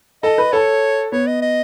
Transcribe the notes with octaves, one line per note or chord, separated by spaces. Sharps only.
A4 D#5
B4
A4 C#5
B3 C#5
D#5
D#5